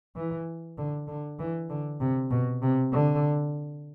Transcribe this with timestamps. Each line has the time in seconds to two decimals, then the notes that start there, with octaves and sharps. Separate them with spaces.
0.16 E3
0.78 D3
1.08 D3
1.39 E3
1.69 D3
2.00 C3
2.31 B2
2.62 C3
2.93 D3